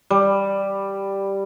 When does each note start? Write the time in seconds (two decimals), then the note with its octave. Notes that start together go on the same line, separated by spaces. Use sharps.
0.11 G3